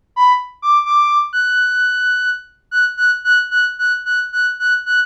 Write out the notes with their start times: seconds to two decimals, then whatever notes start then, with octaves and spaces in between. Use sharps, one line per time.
0.16 B5
0.62 D6
0.86 D6
1.33 F#6
2.71 F#6
2.97 F#6
3.25 F#6
3.51 F#6
3.79 F#6
4.06 F#6
4.33 F#6
4.60 F#6
4.86 F#6